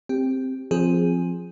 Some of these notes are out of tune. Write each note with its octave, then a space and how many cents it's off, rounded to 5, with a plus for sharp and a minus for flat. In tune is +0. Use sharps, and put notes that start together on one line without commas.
C4 +0 G4 +10
F3 +0 C4 +0 G#4 +0